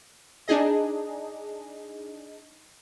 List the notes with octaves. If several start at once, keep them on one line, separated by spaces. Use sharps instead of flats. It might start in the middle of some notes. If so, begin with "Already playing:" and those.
D4 D#4 G#4 D#5